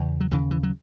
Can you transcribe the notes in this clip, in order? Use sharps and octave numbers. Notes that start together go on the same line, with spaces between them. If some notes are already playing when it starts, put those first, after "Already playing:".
Already playing: E2 C#3
F#3
D#2 C#3 E3
E3
F#3